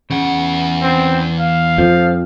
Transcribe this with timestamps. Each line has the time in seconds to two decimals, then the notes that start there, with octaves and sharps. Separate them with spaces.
0.10 E2 C#3 F#5
0.82 C4
1.40 F5
1.78 F2 F3